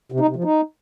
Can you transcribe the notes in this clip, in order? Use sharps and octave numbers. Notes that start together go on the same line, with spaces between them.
C3
D#4
C3
F3
D#4